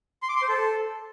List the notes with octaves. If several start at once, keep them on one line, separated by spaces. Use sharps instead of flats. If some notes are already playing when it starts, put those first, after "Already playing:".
C6
D6
C6
C5
A4